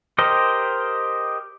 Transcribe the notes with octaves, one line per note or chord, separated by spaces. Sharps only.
G4 A#4 C5 D#5